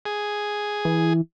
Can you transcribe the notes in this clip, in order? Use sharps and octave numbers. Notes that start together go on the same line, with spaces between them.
G#4
E3